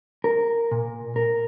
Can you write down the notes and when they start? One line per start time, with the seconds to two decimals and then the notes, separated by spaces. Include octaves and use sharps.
0.24 A#4
0.71 A#2
1.16 A#4